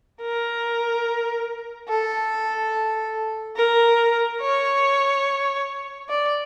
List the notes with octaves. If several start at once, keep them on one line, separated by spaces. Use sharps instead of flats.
A#4
A4
A#4
C#5
D5